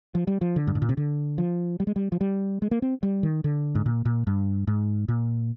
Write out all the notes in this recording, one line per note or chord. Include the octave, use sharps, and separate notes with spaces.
F3
G3
F3
D3
G2
G#2
A#2
C3
D3
F3
G3
G#3
G3
F3
G3
G#3
A#3
C4
G3
D#3
D3
G#2
A#2
A#2
G2
G#2
A#2